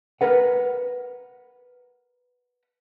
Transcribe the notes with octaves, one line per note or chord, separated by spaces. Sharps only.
A#4 B4 F#5